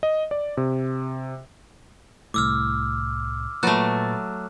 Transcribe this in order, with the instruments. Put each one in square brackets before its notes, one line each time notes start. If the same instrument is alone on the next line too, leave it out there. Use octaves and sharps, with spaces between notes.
[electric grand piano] D#5
D5
C3
[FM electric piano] C2 A2 [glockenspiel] D6 E6 F6
[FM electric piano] A#2 B4 A6 [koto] F#3 A3 [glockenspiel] F#6